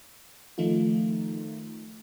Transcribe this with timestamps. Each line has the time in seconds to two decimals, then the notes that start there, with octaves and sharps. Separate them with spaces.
0.58 D#3 F3 A3 D#4 F4